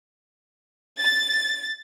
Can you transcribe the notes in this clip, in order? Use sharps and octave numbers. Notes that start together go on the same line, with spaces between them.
A6